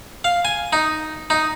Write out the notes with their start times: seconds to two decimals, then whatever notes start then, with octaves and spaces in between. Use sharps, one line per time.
0.24 F5
0.45 G#5
0.73 D#4
1.30 D#4